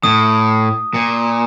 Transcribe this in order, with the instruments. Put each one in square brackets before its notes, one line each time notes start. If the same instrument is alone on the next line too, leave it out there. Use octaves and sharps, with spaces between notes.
[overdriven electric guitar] A2 [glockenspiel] D#6
[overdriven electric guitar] A#2